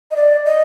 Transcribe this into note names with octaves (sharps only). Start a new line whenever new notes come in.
D#5
D5
D#5